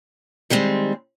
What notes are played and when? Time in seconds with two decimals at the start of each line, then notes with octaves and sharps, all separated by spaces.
0.50 D#3 G3 G#3 C4